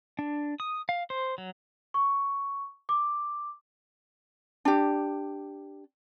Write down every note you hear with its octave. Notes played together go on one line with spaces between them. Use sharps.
D4
D#6
F5
C5
F#3
C#6
D6
D4 G4